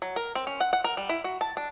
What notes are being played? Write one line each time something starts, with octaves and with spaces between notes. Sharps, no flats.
F#3
A#4
C4
C#4
F#5
F#5
A#4
G3
E4
F#4
A5
D4